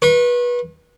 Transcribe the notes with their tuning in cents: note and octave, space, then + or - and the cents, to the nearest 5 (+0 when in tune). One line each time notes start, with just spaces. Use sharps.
B4 -25 C#6 -40